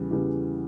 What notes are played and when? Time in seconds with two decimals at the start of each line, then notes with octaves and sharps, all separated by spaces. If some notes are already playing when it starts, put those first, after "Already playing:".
Already playing: E2 C#3 E3 G3
0.11 E2 C#3 E3 G3